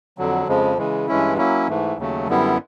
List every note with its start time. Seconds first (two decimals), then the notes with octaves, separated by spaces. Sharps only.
0.18 F2 D3 F#3
0.48 F2 C#3 F3 G#3
0.78 C#3 E3 G#3
1.08 G2 E3 G#3 C#4 E4
1.38 F#3 A#3 C#4 E4
1.68 G#2 E3 A3
1.97 D#2 C#3 F#3 A3
2.28 F#2 D3 G3 B3 E4